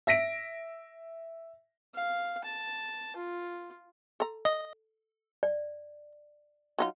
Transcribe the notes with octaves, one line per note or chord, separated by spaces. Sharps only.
E5 A#6 B6 D7
F5
A5
F4
A4 A#5
D#5
D5
F#3 D#4 F4